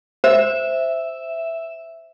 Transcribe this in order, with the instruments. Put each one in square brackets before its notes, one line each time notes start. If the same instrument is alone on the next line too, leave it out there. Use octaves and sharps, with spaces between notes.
[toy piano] C5 [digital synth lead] E5